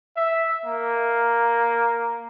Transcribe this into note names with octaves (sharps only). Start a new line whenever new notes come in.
E5
A#3